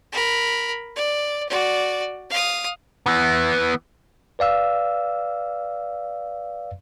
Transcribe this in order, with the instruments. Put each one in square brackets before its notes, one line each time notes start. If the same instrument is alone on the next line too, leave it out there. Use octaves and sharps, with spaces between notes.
[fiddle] A#4 B5
D5
F#4 D5
F5 D#6
[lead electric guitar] E3 B3
[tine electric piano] B4 D5 F5 E6